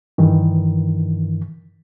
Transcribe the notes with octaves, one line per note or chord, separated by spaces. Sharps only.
G2 D#3 E3